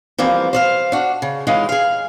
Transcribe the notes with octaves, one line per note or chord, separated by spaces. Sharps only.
E3 F3 G3 A#3 C4
C5 D5 F5
D4 F#4
C#3
E3 G#3 C#4 D#4 F4
G#4 F5